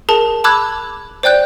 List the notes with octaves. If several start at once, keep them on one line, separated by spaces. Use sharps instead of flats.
G#4 A#4 A5
A5 B5 D6 E6 F#6 G#6
C5 D5 G5 F#6 G6